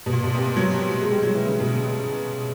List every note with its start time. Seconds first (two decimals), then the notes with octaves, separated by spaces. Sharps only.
0.06 B2
0.13 A#2
0.24 B2
0.35 C3
0.57 F#3
1.01 G#3
1.12 G3
1.22 F#3
1.35 E3
1.46 C#3
1.60 B2
1.75 C#3